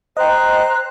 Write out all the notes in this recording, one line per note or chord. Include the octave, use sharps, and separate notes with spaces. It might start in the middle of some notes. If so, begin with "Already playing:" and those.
C5 D#5 G5 A#5 F#6